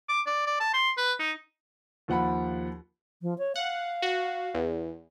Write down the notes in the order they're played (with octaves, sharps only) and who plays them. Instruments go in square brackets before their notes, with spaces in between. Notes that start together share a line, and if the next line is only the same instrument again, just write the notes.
[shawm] D6
D5
D5
A5
C6
B4
D#4
[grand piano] D#2 F3 F#5 B5
[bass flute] F3
C#5
[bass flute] F5 [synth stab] F#5
[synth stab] F#4
E2